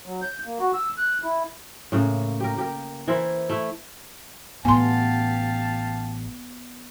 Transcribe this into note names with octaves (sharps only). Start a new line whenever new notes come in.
F#3
G6
A#3
F#4
E6
F#6
E4
A2 C#3 A#3
G4 A#4
G4 A#4
E3 E4 A#4 C5
A3 E4
A1 B3 C#4 G4 F5 G#5 A5 C6